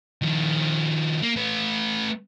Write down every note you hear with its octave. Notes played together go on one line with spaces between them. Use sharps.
D#3 F3
A#3
A3 B4